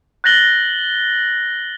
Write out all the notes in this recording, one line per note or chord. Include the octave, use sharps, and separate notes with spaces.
F#6 G6 A6 A#6 F#7 G7